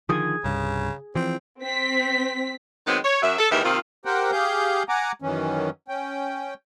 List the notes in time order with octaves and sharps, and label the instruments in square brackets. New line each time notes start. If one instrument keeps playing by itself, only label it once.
[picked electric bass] D3 D#3 F3 [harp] G#4 D#6 G#6
[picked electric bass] C2 G2 [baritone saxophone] C#3
[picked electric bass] E3 F3 [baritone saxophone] C4
[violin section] C4 B6
[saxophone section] D#3 F#3 G#3 B3 C4
C#5
F#2 F#3 E5
A4
D#2 G#2 E3 G4 A#4 E5
C3 D#3 A#3 C4 F4
[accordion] G4 A#4 C5 F#5 G5
G4 G#4 F5 G6
F#5 G#5 A#5 D6
F#2 D#3 E3 C#4
C#4 G5